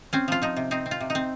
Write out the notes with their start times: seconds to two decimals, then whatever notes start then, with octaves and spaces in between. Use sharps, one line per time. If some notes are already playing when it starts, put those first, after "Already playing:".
0.13 C4 C#4
0.28 F3 F4
0.42 F3 D#4
0.57 C3
0.71 C4 D#4
0.86 C4
0.91 F4
1.00 C3
1.10 D#4
1.15 C4